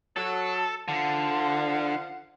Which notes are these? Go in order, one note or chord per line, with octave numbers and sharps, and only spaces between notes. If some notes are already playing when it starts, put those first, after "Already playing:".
F#3 A4
D3 F3 F5 F#5